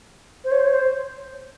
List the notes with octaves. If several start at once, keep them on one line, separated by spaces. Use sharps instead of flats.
C5
C#5
C5
C#5
C5